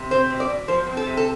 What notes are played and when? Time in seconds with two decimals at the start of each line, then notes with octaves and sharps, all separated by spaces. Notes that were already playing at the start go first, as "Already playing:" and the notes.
Already playing: C3
0.11 C4 C5
0.30 B2
0.40 D5
0.50 B2
0.68 F3 C5
0.87 C4
0.97 A4
1.06 C3
1.17 A4